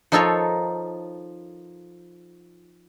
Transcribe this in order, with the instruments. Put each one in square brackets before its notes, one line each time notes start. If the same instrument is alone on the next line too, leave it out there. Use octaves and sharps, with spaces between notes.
[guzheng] F3 D#4 F4 A4 A#4 C#5